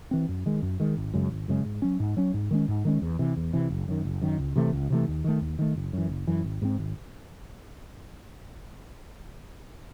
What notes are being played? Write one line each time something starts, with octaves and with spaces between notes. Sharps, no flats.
E3 C4
F#2
D#3 G#3
F#2
D#3 G#3
G#1
F#2 C#3 G#3
G#1
F#2 C#3 G#3
G#2
F#3 C#4
G#2
F#3 C#4
G#2
D#3 G#3 C#4
G#2
D#3 G#3 C#4
E2
C3 E3
E2
C3 E3
F#1
F#2 D#3
F#1
F#2 D#3
C#2
C3 E3 A3
C#2
C3 E3 A3
D#2
D#3 A3
D#2
D#3 A3
F#1
F#2 E3
F#1
F#2 E3
G#1
G#2 F#3 C4
G#1